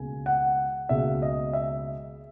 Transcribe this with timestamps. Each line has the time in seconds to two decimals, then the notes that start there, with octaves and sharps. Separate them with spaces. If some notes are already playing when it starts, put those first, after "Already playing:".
Already playing: C#2 B2 A#3 G#5
0.26 F#5
0.89 C#2 B2 A#3 E5
1.22 D#5
1.53 E5